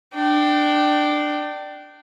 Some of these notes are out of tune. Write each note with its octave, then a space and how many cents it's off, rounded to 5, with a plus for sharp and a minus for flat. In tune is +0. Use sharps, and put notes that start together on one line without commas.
D4 +15 G5 -20